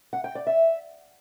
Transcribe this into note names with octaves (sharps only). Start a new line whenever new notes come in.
F#5
G5
D5
E5